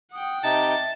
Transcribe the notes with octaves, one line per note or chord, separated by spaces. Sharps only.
F#5 G5 D#6
C3 D#4 E5 A5